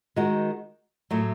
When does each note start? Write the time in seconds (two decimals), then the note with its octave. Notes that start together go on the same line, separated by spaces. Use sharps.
0.16 D#3 G#3 D#4 F#4
1.10 A2 F#3 A3